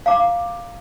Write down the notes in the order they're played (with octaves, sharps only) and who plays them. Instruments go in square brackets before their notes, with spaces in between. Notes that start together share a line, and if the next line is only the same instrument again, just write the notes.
[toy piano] F5 A#5 D6